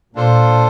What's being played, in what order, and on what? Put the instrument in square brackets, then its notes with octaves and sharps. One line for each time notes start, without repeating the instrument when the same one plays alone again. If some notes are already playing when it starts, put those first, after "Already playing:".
[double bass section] A#2 [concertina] A#3 D4 F4 A4 C5